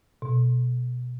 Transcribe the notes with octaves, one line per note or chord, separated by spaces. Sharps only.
B2